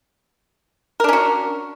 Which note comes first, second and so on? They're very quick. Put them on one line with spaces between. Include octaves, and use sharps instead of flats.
A#4 D4 C#4 F#4